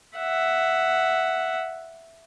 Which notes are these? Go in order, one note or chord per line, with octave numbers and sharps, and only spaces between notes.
E5 F#5